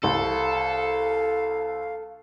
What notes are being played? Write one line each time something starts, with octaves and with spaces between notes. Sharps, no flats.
C2 A4 F5